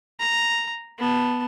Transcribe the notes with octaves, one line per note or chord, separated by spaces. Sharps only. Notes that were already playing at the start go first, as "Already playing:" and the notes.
A#5
B3 A5